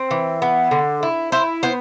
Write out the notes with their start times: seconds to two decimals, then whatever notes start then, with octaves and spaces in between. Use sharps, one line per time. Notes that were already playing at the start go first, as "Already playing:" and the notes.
Already playing: C4
0.11 E3
0.42 B3
0.71 D3
1.03 E4
1.32 E4 C5
1.63 B3 C5